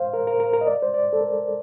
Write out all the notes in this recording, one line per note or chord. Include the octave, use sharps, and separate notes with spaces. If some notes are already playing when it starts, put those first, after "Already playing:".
Already playing: C5 F5
A#4
A#4
A#4
A#4
D#5
D5
C5
D5
A4
A#4